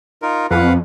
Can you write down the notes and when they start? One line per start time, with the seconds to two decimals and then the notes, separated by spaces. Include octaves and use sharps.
0.22 D#4 F4 A#4
0.51 F2 B4 F5 F#5